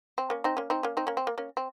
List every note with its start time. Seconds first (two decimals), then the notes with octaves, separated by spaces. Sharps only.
0.18 C4
0.30 A#3 C#4
0.44 C4 D#4
0.57 A#3 C#4
0.70 C4 D#4
0.83 A#3 C#4
0.97 C4 D#4
1.07 A#3 C#4
1.17 C4
1.27 A#3
1.38 A#3 C#4
1.57 C4